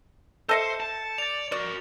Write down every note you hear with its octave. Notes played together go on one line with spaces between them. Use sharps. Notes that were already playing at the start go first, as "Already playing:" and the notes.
A4 C5 D#5 E5 G6 C#7
A5
D5 A6 F7
F#4 A#4 D5